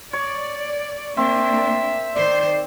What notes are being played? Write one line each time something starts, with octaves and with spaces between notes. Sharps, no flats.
C#5 D5
A#3 C4 D4 E5
D#3 C5 D5